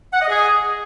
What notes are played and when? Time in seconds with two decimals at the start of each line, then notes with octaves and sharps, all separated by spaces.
0.13 F#5
0.21 D#5
0.29 G#4